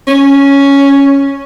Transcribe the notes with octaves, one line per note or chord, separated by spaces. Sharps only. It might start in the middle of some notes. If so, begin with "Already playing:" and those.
C#4